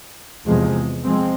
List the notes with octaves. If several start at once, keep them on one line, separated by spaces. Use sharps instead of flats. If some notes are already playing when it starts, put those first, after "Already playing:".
E2 C3 F3 G#3
F3 G#3 C4